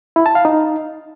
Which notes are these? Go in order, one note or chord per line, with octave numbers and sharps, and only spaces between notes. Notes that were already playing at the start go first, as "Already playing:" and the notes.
E4
A5
F5
D#4